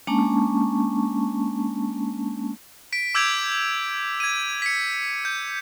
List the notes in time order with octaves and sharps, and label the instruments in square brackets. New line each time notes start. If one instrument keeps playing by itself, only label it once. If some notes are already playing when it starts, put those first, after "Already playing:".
[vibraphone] G#3 A#3 C#4 D4 A5 C#6
[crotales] B6 D7
D6 E6 G6 G#6 D7 F7
G#6 D#7
B6 C#7
G6